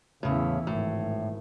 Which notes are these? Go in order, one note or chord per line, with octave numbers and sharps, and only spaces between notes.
E2 A2 C#3 E3
G#1 A2